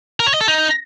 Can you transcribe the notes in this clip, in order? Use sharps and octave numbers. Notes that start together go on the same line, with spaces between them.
A#4
C#5
D#5
A4
D#4